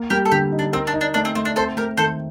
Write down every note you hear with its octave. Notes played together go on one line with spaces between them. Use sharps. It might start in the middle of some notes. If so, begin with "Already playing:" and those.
Already playing: A#3
G3 G4 A#4
A4
D3 G4
D#4
D4
C4 A#4
D4
D#4
D4
A3 D4
C4
A3 C4
D4
C4 A4 C5
A3 G4 A#4
D#3 A4 C5